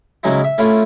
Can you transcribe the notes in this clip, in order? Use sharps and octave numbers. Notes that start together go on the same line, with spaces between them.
C#3 F#3 G#3 C#4 D#4 E4
E5
A3 C#4 E4 F4